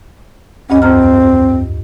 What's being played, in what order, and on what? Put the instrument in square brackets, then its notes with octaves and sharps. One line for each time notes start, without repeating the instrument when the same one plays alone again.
[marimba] D2 G2 D#5 [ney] C#4
[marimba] F2 A#5 F6 [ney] C4